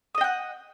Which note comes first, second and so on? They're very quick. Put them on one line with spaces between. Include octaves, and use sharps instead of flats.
D#6 D#5 G5 F#5